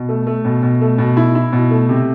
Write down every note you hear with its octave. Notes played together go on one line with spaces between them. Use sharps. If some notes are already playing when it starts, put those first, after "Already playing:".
Already playing: B2
A3
A3
B2
B2
A3
B2
E4
E4
B2
A3
C3